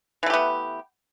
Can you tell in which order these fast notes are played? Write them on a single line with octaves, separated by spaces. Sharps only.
E3 A3 G4 B3